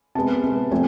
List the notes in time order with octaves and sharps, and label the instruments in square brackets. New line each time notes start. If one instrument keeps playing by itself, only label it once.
[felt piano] C3 G#3 B3 A5
C3 G#3 B3
C3 F3 A3 C4 G#5